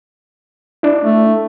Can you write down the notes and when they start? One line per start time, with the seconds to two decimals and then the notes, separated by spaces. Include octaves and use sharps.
0.83 D4 E4
1.03 A3